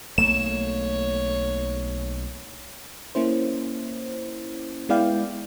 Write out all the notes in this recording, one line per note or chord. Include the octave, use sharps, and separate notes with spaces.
B1 A3 A#3 C#5 E7
A#3 C#4 E4 C5
G#3 B3 E4 D5 F5 G5